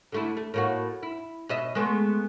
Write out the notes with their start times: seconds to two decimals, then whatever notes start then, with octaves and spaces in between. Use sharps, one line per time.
0.12 D3 A3 E4
0.37 A3
0.54 A2 A#3 F#4
1.03 E4
1.49 B2 D#5 E5
1.75 G#3 A3 B3